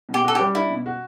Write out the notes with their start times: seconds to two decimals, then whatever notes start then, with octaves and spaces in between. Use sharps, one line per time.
0.09 B2
0.14 G4
0.24 F#4 A4
0.35 G4
0.39 G3
0.55 D4 E4
0.70 B2
0.86 F#4